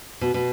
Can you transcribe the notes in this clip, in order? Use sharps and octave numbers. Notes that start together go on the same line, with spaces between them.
B2
B2